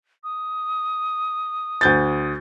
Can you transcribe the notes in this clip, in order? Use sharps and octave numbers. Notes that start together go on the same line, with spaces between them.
D#6
D2 G6 A6